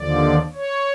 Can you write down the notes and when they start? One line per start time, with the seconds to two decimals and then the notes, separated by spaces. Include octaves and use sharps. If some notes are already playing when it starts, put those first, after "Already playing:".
Already playing: D#2 D3 F3 D5
0.54 C#5